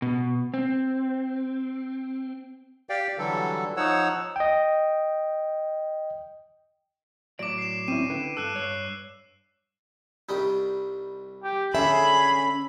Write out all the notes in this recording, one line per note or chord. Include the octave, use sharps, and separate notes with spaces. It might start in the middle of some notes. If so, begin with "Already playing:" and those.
B2
C4
G4 D5 F5 G5
D3 E3 F#3 G3 A4
F3 D#4 C#5 F#5 E6
D#5 G5
A2 F#3 D5 D6 D7
C7 E7
C4 C#4 E4 D#7
D3 E4 B4 G5
G2 A4 E6 F#6
G2 C#5 C7
C2 G3 D#4
G4
D3 C#4 G#4 A4 E5 B5